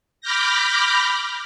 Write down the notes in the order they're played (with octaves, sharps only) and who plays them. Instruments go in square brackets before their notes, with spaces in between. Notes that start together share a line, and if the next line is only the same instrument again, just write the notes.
[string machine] B5 D6 F6 G6 A#6